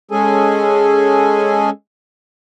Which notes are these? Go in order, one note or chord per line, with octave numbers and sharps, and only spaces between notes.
G#3 C#4 G#4 A4 G#5